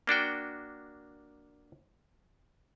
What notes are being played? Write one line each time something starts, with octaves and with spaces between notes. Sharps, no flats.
A#3 D4 F#4 G5